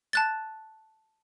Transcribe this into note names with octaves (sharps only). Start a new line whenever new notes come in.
A5 F#6 A6